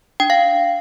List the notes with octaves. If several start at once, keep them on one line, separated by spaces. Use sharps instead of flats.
D4 G5
F5